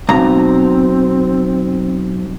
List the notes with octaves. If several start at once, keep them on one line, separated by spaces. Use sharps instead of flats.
B1 C4 A#5